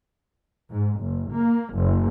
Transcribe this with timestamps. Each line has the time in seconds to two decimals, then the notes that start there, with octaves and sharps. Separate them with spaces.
0.68 G#2
1.01 F#1
1.34 A#3
1.74 F#1